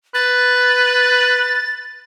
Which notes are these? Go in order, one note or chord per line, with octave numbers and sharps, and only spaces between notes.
B4 A6